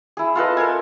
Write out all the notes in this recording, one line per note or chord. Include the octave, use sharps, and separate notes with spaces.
E4 G#4
F4 A4 B4 D#5
A4 A#4 G#5